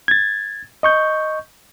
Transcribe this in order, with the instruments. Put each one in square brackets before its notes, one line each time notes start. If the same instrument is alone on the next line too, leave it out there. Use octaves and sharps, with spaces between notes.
[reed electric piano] G#6 A6
D#5 C#6 G6